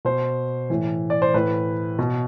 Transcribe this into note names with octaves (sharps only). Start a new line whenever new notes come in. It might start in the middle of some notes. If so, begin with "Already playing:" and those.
B2 C5
A2 E3
D5
C5
A2 E3 B4
B2